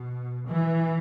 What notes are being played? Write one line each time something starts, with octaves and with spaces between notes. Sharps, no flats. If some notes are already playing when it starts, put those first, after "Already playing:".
Already playing: B2
E3